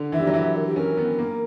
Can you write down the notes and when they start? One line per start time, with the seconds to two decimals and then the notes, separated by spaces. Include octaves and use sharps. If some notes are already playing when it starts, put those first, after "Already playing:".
Already playing: D3
0.12 E3 E5
0.20 G3
0.27 F#3
0.34 E3 E5
0.56 A#4
0.67 G4
0.76 C#4 A#4
0.97 B3
1.19 A#3